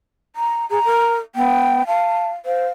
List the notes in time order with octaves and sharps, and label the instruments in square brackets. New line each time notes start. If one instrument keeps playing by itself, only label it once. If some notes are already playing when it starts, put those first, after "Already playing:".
[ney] A#5
[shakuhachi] G#4 [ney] A#5
[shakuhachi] A#4
[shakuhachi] B3 [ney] G5
[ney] F5 [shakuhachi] A5
[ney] C5 [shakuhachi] F5